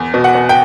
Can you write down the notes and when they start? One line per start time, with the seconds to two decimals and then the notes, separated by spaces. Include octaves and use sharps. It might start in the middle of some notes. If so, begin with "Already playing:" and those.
Already playing: E2
0.14 B2
0.24 F#5
0.35 B2
0.49 G5